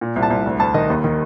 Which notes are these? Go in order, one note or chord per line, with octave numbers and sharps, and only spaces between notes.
A#2
C2
A5
C2
D2
D2 A5
D#3 D#5
D#2
D#3